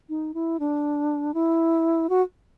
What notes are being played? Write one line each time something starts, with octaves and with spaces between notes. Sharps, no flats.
D#4
E4
D4
E4
F#4